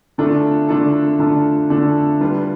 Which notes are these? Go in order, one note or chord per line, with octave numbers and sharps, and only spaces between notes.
D3 A3 D4 F4 A4
D3 A3 D4 F4 A4
D3 A3 D4 F4 A4
D3 A3 D4 F4 A4
G3 D4 F4 B4